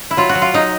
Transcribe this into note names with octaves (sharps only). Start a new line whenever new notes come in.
E4
F#3 F4
F#4
F#3
F4
F#3 D#4